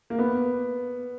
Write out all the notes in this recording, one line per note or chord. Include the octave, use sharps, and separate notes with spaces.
A#3
B3